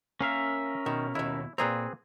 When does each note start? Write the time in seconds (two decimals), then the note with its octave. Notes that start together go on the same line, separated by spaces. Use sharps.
0.21 A#3 C#4 A#4 E5 F5
0.86 B2 D#3
1.15 D#2 B2 E4
1.58 A#2 A#3 C4 G#4 B4 A#5